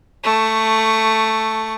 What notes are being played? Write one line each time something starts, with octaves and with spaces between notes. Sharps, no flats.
A3 C#6